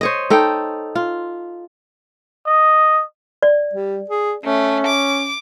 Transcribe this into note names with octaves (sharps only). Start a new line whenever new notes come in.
C5 C#5 D#5
D#4 A4 G5
F4
D#5
D5
G3
G#4
A3 C#4
D6